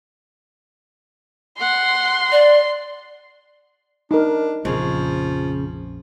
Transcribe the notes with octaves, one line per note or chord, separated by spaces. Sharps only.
F#5 C6
D5
D4 D#4 A#4
A#1 F2 C#3 F3